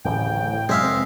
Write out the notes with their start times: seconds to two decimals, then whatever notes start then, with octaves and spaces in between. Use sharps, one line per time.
0.05 D1 A1 A2 C#3 G5
0.69 F#2 C3 F#3 G#3 E5 F5
0.83 F1 C4